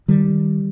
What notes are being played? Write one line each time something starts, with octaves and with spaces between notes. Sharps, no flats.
D#3 G3